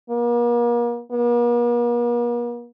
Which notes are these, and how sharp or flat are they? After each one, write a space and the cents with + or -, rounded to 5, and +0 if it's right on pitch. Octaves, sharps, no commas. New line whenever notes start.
A#3 +40
A#3 +45